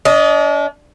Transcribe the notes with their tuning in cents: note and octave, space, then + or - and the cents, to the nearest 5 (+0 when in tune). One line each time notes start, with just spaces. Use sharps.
D4 -40 D#5 +5